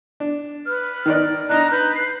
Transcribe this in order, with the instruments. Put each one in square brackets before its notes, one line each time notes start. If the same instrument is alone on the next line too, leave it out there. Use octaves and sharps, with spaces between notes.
[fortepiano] D4
[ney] B4 [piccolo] F6
[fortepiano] D#3 D#4 D5
[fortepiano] D4 D#4 D#5 [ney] A#5 [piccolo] F#6
[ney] B4 [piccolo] G6
[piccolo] C7